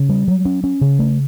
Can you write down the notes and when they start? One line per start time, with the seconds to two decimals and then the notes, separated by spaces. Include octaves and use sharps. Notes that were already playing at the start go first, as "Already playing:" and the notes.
Already playing: C#3
0.09 G3
0.28 F#3
0.45 C#4
0.64 C#4
0.81 C#3
0.99 A3